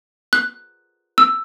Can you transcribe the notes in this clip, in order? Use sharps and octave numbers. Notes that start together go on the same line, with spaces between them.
F#6
E6